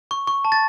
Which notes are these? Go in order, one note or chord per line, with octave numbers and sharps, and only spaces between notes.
C#6
C#6
A5
A6